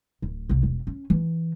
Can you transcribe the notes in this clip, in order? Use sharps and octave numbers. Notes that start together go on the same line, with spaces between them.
D1
C2 C3
E1
C#4
E3